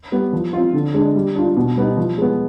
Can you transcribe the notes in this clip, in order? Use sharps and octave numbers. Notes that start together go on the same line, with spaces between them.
G3 B3
F3
C4 F4
D3
G#3 D4
G3
D4 F4
B2
G3 B3 D#4
F3
G#3 B3